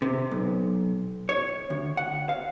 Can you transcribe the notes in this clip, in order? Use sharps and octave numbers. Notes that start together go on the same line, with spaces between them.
C3
B1
C#5
D2
F#5
F5